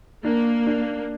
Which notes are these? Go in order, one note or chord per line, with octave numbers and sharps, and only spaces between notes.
A#3 D4
D4